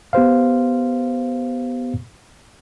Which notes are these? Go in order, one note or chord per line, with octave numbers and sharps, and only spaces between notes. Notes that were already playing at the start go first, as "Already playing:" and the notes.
B3 G4 C5 F5